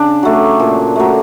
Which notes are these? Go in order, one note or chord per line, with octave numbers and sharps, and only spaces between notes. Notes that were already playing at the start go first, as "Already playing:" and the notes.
Already playing: C#3 D4
F#3 A3
A#2
F#3 A3